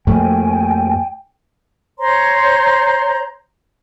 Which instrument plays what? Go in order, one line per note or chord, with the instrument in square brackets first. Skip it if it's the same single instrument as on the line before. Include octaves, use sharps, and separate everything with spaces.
[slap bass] F2 A3 A#3 [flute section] G5 G#5
[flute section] C5 C#5 A#5 C6